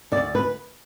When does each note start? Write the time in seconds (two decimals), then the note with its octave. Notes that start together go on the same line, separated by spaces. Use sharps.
0.12 D2 D5
0.35 B4